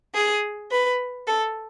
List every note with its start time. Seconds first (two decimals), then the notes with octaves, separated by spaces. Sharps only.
0.14 G#4
0.71 B4
1.27 A4